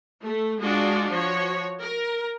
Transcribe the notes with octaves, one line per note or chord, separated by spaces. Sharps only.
A3
G#3 D4 F4 F#4 D5
F3 F#4 C#5
A#4